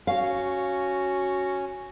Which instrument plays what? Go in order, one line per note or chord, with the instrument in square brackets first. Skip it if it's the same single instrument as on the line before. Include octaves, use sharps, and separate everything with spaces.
[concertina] C#4 [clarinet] F#4 [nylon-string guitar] F5